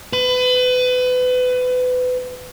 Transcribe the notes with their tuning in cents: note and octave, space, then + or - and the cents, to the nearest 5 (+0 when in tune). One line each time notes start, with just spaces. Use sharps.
B4 +30